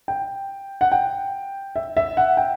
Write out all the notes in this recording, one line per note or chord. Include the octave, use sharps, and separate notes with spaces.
G5
F#5
G5
E5
E5
F#5
G5